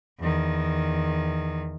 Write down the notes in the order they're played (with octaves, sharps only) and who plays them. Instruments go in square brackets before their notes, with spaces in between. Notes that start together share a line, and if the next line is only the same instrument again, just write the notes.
[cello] E2 D#3